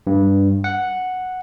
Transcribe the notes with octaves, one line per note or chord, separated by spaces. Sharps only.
G2
F#5